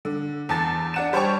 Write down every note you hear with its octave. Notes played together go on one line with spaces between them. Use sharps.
D3
E2 A5 A6
D4 F#5 E7
G3 C5 C#5 G5 A5 C#6